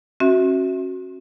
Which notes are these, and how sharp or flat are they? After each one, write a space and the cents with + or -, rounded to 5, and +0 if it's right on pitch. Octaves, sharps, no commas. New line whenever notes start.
C#4 -40 F#4 +0 E5 -10